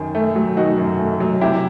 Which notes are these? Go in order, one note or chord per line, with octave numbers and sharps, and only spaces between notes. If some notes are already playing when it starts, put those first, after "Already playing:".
Already playing: F#2 D#3
A3
F#3
D#3 D#4 F#4
F#2
A3
F#3
C3 E4 G4